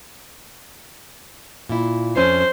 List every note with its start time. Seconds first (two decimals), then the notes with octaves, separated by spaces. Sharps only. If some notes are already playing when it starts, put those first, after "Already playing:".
1.69 A#2 E4
2.16 F2 C#4 C5